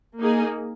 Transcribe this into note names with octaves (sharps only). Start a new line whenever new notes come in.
A#3 D#4 G#4